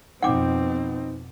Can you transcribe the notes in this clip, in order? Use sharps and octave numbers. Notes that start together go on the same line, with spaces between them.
F2 B2 C4 D#4 F#5 G5 D6